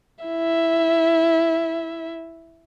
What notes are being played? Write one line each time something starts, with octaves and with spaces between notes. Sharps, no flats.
E4 E5